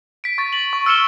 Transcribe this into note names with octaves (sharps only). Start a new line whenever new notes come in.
B6 D7
C#6 A6
B6 F#7
C#6
E6 F6 C#7 E7 G7